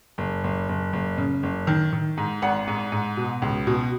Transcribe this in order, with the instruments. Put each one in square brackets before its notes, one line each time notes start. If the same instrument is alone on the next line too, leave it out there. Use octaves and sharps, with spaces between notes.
[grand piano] F#1
F#1
F#1
F#1
C#3
F#1
D#3
D#3
G#2
G#1 F#5
G#2
G#2
B2
C#2
B2